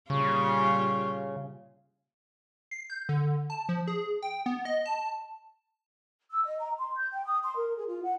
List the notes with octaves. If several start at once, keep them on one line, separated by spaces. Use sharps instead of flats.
A#2 C#3 G3 F4 C#6
C7
G6
D3
A5
F3
G#4
G5
B3
D#5
A5
E6
D#5
A#5
C6
G6
G5
D#6
C6
A#4
G#4
F4
F#5